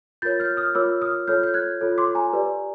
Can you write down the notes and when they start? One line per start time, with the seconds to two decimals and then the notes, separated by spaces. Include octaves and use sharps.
0.22 F4 A#4 C#5 G6 A6
0.40 F6 G6
0.57 D#6 F6
0.75 F4 A#4 C#5 D6 E6
1.02 D#6 F6
1.28 F4 A4 C#5 F6 G6
1.43 G6
1.54 F#6 G#6
1.81 F4 A4 C#5
1.98 C6 D6
2.15 G#5 A#5
2.33 G4 B4 D5